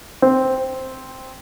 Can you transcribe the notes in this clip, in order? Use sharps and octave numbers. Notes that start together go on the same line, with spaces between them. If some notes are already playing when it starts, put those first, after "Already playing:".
C4